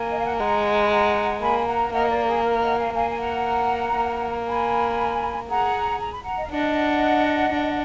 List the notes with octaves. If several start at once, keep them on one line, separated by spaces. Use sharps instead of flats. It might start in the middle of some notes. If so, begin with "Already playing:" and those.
Already playing: A#3 G#5
D#5
F5
F#5
G#5
G#3 F#5 A#5
B5
F#5 A#5
A#3 G#5 B5
G#5
F#5 A#5
A#3 D#5 F#5
A#4 D5
A#4
G#4
A#4
D#5 F#5
F5 G#5
A#3 F5 G#5
G#5
F#5 A#5
A#3
G#5 B5
G#4 F#5 A#5
A#5
B5
F#5 A#5
D#5
F5
D4 D#5 F#5
D4